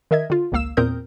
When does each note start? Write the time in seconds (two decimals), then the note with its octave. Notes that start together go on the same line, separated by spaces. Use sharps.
0.11 D#3 A#4 D#5 E5 G#6
0.30 D3 F4
0.52 G#1 C#2 A#3 F5 E6 E7
0.77 E2 A#2 C4 A#4 D#6 G6